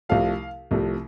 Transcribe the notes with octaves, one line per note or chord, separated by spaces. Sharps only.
C2 C3 F3 A3 F5
C2 C3 F3 A3